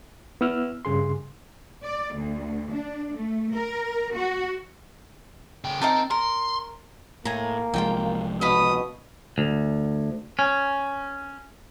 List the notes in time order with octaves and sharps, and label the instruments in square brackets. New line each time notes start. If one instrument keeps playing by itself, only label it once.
[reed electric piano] B3 E4 E6 F6
G2 C#3 G#4 C6
[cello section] D5
D2
D4
A3
A#4
F#4
[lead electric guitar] C#3 G5
[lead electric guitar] C4 [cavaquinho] D#4 A#4 A5
[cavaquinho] A#4 [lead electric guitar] C6
[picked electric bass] A2 [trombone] A#3 [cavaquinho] G#5 A#5
[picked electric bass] C2 F3 G#3 [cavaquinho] F4 F#4 G5
[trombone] B2 [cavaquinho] D#5 F5 B5 [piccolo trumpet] D#6
[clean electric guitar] D2
C#4